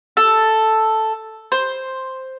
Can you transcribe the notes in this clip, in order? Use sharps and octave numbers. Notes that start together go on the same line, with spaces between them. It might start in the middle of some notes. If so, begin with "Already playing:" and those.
A4
C5